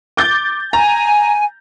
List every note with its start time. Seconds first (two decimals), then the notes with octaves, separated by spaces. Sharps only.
0.17 D6 G6 A6
0.73 G#5 A#5